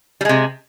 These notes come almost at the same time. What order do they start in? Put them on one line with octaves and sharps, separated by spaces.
G3 G#3 C3